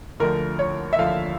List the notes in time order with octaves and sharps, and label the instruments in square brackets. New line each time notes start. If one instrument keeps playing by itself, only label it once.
[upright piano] D2 D3 F3 A3 A#4
C#5
E5
D2 D3 F3 A3 F5